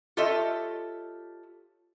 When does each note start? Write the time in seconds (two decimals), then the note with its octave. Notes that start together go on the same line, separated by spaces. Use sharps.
0.17 F4 G4 A4 C#5 D#5 E5